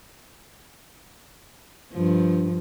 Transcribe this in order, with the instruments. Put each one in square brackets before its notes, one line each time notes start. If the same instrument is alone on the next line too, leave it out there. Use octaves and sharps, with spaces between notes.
[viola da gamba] G2 F3